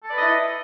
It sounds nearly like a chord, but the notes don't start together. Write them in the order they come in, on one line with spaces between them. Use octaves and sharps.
A4 D5 B4 D#5 E4